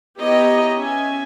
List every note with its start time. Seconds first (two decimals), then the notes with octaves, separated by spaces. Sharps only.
0.19 B3 E4 G4 C#5 D#5 A#5
0.77 C#4 E5 G#5